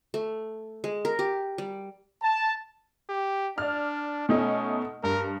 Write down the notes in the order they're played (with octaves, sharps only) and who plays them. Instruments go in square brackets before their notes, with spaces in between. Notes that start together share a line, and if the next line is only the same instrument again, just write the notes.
[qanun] A3
G#3
A#4
G4
G3
[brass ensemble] A5
[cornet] G4
[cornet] D4 [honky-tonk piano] D5 F6
[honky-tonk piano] B2 A3 D#4 [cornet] C#4
[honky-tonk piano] G2 [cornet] A#4